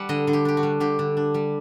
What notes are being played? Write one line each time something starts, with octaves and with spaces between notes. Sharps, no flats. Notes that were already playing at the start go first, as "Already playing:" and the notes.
Already playing: G3 F#5 A5
D3 D#5
D3
G4
D4 G4
F#4
G3
D3 G4
D3
D4
G3